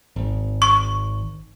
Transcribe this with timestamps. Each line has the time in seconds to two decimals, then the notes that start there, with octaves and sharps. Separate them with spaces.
0.16 G#1
0.62 C#6